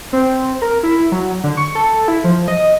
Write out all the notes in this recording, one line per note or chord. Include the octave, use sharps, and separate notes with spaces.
C4
A#4
E4
F#3
D3
C#6
A4
E4
F3
D#5